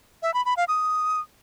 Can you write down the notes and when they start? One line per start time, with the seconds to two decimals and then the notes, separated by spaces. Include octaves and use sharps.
0.22 E5
0.34 B5
0.45 B5
0.57 F5
0.68 D#6